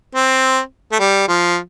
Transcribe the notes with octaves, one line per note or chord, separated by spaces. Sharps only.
C4
A3
G3
F3